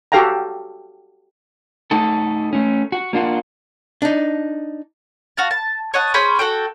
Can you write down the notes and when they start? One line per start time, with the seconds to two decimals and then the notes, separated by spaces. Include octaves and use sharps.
0.12 F#4 G4 A4 F5 G5 A#5
1.91 A3 D#4 F#4 A4
2.53 A3 C#4
2.92 F#4
3.13 A#3 D4 F4 F#4
4.02 D4 D#4
5.37 F#4 F5 A5
5.51 A5
5.94 C#5 D#5 F#5 A5
6.14 C#4 G#4 C5 B5
6.39 F#4 A4 G5